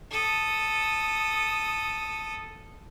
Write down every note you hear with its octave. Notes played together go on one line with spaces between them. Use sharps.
A4 D#6